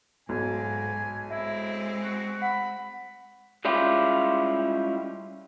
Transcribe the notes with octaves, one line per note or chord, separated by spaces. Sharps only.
B1 G#2 G#5
G#3 C4 E4 E5
F#4
F#5 B5
G3 G#3 C#4 E4 F4 G4